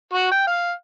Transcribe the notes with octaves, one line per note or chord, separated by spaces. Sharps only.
F#4
G5
F5